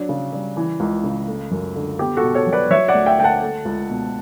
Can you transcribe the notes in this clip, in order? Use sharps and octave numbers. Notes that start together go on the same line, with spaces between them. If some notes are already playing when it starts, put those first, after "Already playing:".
Already playing: F#3 D4
C#3
G3
E3
C#2
C#3
A3
F#2
D3
B3 G4
F#4 A4
B2
A4 C#5
F#3
B4 D5
F#3 C#5 E5
D5 F#5
D2
E5 G5
D3 G5
F#5 A5
A3
C#2
B2